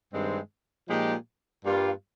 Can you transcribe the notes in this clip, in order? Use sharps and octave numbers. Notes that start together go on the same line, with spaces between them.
G2 D#3 G#3 C4
A#2 F3 G#3 D#4 G4
G2 G3 A#3 F4